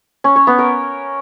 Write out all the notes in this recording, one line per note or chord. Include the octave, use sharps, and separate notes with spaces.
C#4
C#5
B3
A#4